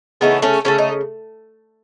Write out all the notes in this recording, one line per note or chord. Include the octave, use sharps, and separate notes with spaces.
C#3 E3 A3 B3 D#4
A3 C#4
C#3 E3 A3 C#4
D#4